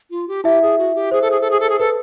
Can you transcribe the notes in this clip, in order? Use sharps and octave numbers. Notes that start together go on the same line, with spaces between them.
F4
G4
E4 G4 E5
G#4
F#4
G4
G#4 C5
A4
G#4
A4
G#4
A4
G#4
A4 B4